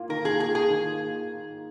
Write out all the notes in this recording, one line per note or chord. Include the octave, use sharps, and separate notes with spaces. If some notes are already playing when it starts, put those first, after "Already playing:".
Already playing: A#3 F4
D#3 A#4
G#4
A#3 F4 G#4
G#4
D#3